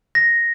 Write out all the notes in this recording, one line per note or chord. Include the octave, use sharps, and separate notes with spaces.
A#6